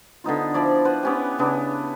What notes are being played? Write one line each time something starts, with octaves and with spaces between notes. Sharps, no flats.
D3 B3 D#4 F4
F3 E4 D5
B4 C5 F#5
B3 C#4 G4
C#3 B3 D4